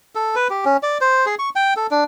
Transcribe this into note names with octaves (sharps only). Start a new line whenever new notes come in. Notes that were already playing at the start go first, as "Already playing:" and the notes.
A4
B4
G4
C#4
D5
C5
G#4
C#6
G5
A4
D4